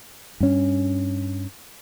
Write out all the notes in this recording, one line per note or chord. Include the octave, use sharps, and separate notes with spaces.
G2 C#4